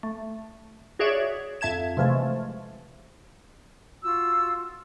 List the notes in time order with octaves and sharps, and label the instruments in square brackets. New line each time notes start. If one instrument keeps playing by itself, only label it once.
[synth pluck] A3
F#4 G#4 C#5 D5 E5
F2 E5 A5 G#6 E7
C3 E3 F3 G#3 A3
[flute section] F4 F#4 E6